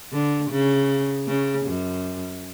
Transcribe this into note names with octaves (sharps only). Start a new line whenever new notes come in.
D3
C#3
C#3
F#2